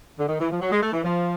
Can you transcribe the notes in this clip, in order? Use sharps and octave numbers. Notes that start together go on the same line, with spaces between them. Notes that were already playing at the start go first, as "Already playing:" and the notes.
D3
D#3
E3
F3
F#3
G#3
A3
E3
F3